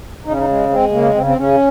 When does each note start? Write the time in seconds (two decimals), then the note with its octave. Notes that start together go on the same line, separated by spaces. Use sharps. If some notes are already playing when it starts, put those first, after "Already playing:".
0.25 C#3 D#4
0.32 C#4
0.40 D#4
0.48 G#3
0.69 G#3 C4
0.91 C#3 A#3
1.14 C#3 C4
1.26 C4
1.37 C#3 C#4